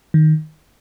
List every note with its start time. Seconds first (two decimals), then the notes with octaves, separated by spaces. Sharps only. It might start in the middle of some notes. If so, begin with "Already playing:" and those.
0.14 D#3